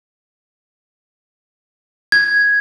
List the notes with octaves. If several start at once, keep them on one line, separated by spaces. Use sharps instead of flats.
G#6